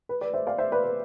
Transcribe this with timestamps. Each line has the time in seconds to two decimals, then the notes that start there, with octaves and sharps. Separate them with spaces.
0.09 B4
0.21 B4 D5
0.34 C5 E5
0.47 D5 F5
0.58 C5 E5
0.72 B4 D5
0.84 B4